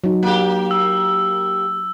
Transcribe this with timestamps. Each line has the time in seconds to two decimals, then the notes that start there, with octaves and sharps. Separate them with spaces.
0.04 F#3 D#4
0.23 A#3 G4
0.71 E6